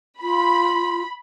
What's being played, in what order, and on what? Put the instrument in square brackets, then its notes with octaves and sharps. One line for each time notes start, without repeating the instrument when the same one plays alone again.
[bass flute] F4 [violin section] B5